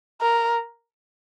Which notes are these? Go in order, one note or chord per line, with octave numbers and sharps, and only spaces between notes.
A#4